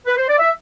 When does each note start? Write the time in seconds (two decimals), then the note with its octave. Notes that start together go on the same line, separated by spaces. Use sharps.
0.07 B4
0.17 C5
0.28 D5
0.39 E5